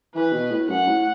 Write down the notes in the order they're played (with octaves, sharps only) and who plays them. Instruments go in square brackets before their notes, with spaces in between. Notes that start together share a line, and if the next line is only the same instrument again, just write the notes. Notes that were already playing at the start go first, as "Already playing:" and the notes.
[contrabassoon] E3 [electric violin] B4
[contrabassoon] B2
A2
[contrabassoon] F#2 [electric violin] F#5
[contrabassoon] A2